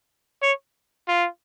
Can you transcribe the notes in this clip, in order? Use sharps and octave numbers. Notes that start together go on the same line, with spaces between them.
C#5
F4